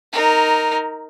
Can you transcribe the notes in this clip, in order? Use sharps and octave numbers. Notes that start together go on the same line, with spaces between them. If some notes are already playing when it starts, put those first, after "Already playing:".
D#4 A#4